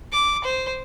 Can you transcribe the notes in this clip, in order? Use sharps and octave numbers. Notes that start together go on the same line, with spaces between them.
D6
C5